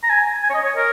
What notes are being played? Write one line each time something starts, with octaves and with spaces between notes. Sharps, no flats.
A#5
G#5
G#5
C#5
D#5
C#5
A#4